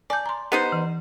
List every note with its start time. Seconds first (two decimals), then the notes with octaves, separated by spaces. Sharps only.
0.10 D5 G#5 A5 G6
0.26 A#5 C6
0.52 B3 D#4 G4 C5
0.72 E3